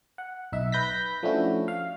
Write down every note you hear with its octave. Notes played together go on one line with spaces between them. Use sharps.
F#5
B1 D#4 E5
B4 G6 A#6 B6
F3 A3 C#4 D4 E4 F#4
F5